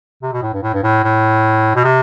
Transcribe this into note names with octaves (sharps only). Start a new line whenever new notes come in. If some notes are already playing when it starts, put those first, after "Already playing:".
C3
B2
A2
G2
A2
G2
A2
A2
B2
C3